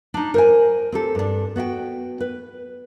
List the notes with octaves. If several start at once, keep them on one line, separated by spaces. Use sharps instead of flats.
D4 D#4
A#4 C5 G#5
C4 G4 A4
G2 D4
B3 F#4 E5 G5
B4